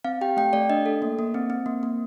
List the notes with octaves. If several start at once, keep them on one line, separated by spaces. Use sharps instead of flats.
C4 F5
G4 G5
A3 G5
A3 D5
D4 D#5
A4
A#3
A#3
C4
C4
A#3
A#3